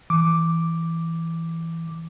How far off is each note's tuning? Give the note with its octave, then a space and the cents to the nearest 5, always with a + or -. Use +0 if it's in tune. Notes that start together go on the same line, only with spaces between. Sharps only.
E3 +0 D6 +0